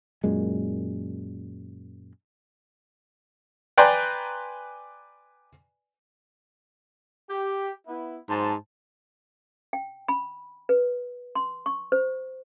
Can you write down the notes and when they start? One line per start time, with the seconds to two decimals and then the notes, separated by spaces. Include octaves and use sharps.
0.24 F#2 A#2 G#3
3.78 B4 D5 G5 G#5 A#5 C6
7.29 G4
7.87 B3 E4
8.29 G#2 F#3 C5 A5
9.73 G5
10.09 B5
10.69 B4
11.35 C6
11.66 C#6
11.92 C5